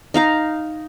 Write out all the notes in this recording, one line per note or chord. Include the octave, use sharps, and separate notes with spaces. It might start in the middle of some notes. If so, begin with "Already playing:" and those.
D#4 F5 A#5